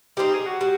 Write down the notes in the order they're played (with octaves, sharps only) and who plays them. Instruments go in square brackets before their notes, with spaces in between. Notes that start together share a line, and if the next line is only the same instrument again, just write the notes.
[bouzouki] G3 C4 D#4 [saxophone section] G4
[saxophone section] G#4
F#4
[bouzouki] G3